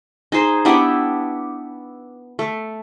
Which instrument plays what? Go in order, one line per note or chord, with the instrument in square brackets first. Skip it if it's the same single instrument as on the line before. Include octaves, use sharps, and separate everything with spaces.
[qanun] D#4 G#4 C5
B3 D4 E4 G4
A3